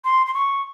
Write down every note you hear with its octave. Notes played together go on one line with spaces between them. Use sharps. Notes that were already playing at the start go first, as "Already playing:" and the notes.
C6
C6
C#6